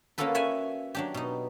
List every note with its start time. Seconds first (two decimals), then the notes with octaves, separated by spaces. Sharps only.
0.18 A#3 C#4 F4 F#4 A4 B4
0.35 C#5 E5 F#5 G#5
0.95 F#3 D4 G4
1.14 B2 D#4